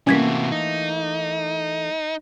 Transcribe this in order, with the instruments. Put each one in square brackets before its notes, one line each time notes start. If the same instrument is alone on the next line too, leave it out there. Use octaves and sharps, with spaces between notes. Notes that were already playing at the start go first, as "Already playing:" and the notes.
[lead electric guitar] C3 F#4 [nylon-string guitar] E3 A3 A#3 [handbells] C#4 G#6 B6
[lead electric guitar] D#4